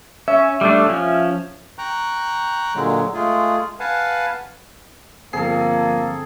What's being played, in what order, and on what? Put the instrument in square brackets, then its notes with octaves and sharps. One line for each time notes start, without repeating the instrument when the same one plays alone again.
[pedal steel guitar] C#4 [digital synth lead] E5
[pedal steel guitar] G3 A3 D4
F3 C#4
[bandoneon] G5 A#5 C#6 F#6
A#2 D3 F#3 G#3
G#3 A3 F4 G#4
B4 F5 F#5 G#5 A5
[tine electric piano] G1 C4 C7 [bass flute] F3 [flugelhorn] A#3 [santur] G#4 A4